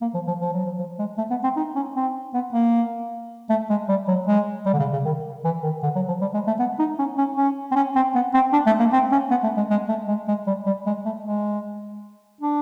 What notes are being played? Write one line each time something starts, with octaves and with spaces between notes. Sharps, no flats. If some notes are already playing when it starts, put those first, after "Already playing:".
A#3
F3
F3
F3
F#3
F3
F3
G#3
A3
B3
C4
D#4
C#4
C4
B3
A#3
A3
G#3
G3
F#3
G#3
G3
D3
C#3
C#3
D#3
E3
D#3
D3
F#3
F3
G3
G#3
A3
B3
D#4
C#4
C#4
C#4
C4
C#4
C4
B3
C4
D4
A3
A#3
C4
C#4
B3
A3
G#3
G#3
A3
G#3
G#3
G3
G3
G#3
A3
G#3
D4